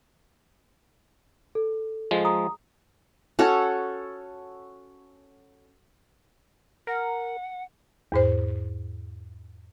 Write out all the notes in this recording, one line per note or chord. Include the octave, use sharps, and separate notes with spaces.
A4
F3 G#3
A#5 D#6
C#4 F#4 A4 C#5
A#4 F#5
E2 G#2 C5